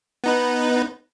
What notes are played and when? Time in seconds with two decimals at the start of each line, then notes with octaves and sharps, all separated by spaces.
0.24 B3 D#4 B4